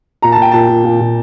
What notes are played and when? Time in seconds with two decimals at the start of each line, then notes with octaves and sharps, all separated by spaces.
0.22 A#2 A#5
0.32 A5
0.38 A#2 G5
0.52 A#2 A5
0.69 A#2
0.84 A#2
1.01 A#2